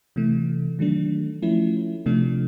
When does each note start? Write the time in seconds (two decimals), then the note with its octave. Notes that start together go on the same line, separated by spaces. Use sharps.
0.16 C3 E3 A3
0.79 D#3 F#3 A3 D4
1.42 F3 A3 C#4 E4
2.06 C3 F3 A3 D4